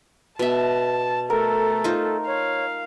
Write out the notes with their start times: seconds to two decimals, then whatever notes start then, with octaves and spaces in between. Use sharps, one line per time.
0.39 B2 E5 A5
1.30 A3 A4 A#4
1.84 D#4 F4 C5
2.27 C#5 F5